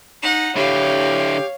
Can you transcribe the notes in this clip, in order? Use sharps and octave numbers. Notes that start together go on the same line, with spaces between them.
D#4 F#5
D3 E4 G4 C#5 F5